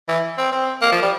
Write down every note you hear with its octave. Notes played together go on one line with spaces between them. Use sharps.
E3
C4
C4
A#3
F3
G3